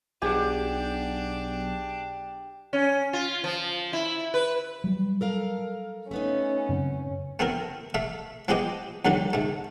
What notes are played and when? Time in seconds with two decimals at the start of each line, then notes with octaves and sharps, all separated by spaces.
0.22 B1 D4 G4 G#4 F#5
2.73 C#4
3.13 F4
3.44 F3
3.93 E4
4.34 B4
4.84 F#3 G3
5.21 A4 A#4 F5
6.11 A3 B3 C#4 D#4
6.69 F#2 C#3 C4
7.39 A3 B3 C4 E4 A#4
7.94 A3 E5 F5
8.48 F3 G#3 B3 G4 C5 D#5
9.05 D#2 D3 D#3 F#3 G3
9.33 G#2 A3